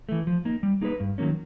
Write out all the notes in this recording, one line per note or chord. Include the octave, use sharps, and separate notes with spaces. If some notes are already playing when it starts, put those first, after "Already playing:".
E3 A3
F3
A#3 D#4
G3
A#3 D#4 G#4 B4
G2
D#3 F#3 A#3 C#4